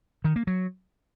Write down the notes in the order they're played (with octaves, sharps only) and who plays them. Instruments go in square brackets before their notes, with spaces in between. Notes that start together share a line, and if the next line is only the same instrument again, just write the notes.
[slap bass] D#3
A#3
F#3